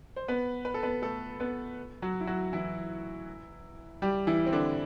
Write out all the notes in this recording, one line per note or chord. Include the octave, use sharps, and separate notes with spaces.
C5
B3 B4
B4
A4
B3 B4
A3 A4
B3 B4
F#3 F#4
E4
F#3 F#4
E3 E4
G3 G4
E3 E4
C4
D3 D4